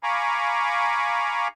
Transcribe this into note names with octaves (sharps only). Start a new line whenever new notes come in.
F5 G#5 A#5 B5 C#6 D6